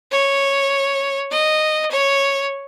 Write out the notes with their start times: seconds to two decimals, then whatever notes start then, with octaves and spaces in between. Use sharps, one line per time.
0.12 C#5
1.31 D#5
1.91 C#5